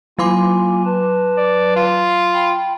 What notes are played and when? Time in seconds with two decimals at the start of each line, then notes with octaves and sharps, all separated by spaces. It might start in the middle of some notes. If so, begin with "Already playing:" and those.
0.19 F#3 A#3 F4 G#5 C6 D6
0.85 B4 A5
1.38 D5
1.76 F4
2.33 G5 B5